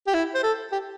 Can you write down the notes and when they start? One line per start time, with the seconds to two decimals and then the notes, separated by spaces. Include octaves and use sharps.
0.07 G4
0.14 E4
0.34 C5
0.43 A4
0.72 G4